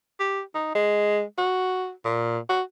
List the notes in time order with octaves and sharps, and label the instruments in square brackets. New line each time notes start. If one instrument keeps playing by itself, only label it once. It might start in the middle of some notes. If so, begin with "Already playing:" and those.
[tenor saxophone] G4
D#4
G#3
F#4
A#2
F#4